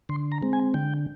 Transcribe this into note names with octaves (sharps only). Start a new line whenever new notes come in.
D3 C6
A#5
G#3 C4
G#5
D3 G5